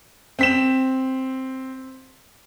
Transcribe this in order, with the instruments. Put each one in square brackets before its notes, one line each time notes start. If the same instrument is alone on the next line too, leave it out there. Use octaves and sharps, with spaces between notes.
[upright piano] C4 B6 E7